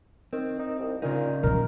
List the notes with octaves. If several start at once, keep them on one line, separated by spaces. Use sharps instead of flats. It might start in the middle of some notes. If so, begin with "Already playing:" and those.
D#3 C4
D#4
C2
A#2 C#3 D#4
A#2 F3 A#4